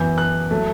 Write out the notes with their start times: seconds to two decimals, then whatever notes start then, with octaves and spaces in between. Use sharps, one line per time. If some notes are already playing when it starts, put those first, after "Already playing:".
Already playing: F#2 E3 B3 G6
0.18 F#6
0.51 F#3 A3